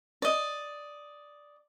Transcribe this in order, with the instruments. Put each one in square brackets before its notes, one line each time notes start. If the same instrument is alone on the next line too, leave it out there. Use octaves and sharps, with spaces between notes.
[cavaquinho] D5 D#5